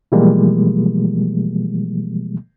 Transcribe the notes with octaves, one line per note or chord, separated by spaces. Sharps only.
B2 E3 F3 G3 G#3 A#3